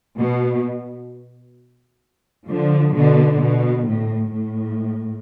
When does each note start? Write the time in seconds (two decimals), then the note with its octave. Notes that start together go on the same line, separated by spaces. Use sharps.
0.18 B2
2.48 D3 F3
2.95 B2 D3
3.42 B2
3.87 A2
4.33 A2